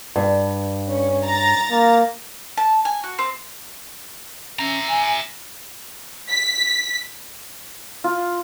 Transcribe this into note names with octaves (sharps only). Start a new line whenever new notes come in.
G2
C#4
A#5 A6
A#3
A5
G#5
F#4
C4
C#4 E5 A#5
G#5
B6
F4